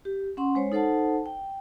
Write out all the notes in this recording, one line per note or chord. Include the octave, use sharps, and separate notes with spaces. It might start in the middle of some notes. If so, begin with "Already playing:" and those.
G4
C#4 F#5 C6
G#3 C5 C#5
D#4 A4 C5 F#5 A5
G5